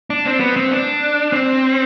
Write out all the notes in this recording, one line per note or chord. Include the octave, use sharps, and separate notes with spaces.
D4
C4
B3
C4
D4
C4